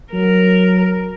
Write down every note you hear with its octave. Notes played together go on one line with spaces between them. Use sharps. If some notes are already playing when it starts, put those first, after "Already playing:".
F#3 A#4